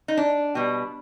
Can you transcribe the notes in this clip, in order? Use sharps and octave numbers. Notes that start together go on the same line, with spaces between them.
D#4
D4
B2 G3